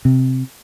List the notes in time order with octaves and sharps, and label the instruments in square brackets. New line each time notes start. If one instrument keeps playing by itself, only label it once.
[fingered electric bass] C3